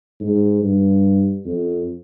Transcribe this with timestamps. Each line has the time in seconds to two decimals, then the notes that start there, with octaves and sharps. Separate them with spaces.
0.20 G#2
0.62 G2
1.45 F2